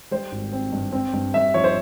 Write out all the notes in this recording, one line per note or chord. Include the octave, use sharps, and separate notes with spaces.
G3 C5
G#1
C4
G2
C4
G2
G2 E5
F3 C#5
C5